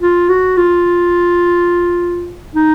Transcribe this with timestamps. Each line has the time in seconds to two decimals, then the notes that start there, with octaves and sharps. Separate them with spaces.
0.01 F4
0.29 F#4
0.57 F4
2.55 D#4